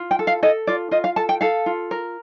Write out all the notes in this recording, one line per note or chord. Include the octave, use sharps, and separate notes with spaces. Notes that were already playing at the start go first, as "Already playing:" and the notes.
Already playing: F4
G5
A4
F5
A4 D#5
F4 D5
F4 D#5
F5
A4 A5
G5
A4 F5
F4
A#4